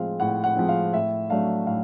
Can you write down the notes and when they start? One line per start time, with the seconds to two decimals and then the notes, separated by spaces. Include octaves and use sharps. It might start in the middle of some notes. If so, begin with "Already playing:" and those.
Already playing: A2 F3 G#3 C4 F5
0.20 A2 F#5
0.44 F#5
0.56 F3 G#3 C4
0.69 F5
0.93 A2 E5
1.30 F#3 A3 D4 F5
1.66 A2 F5